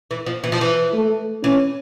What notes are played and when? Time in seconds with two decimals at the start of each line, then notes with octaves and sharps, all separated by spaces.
0.11 E3
0.26 F3
0.44 E3
0.52 F3
0.61 E3
0.94 A3
1.43 E3 C#4